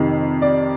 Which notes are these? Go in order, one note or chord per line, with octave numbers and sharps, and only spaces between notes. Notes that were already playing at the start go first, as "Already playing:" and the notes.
Already playing: F2 C3 D#3
D5